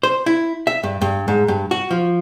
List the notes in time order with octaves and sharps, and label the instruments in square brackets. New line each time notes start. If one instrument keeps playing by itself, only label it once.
[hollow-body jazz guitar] C5
E4
E5
G2
G2
G#2
G2
F#4
F3